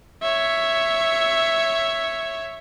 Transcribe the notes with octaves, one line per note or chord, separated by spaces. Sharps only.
C#5 E5